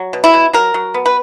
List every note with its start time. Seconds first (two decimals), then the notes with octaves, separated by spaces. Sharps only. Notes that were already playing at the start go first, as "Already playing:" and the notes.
Already playing: F#3
0.13 B2
0.24 E4
0.34 B2
0.53 F#3 A#4
0.74 F#3
0.94 B3
1.06 B4